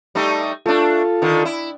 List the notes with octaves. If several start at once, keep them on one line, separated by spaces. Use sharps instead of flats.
G3 A3 D#4
A3 D4 F4 A4
D3 D#3
E4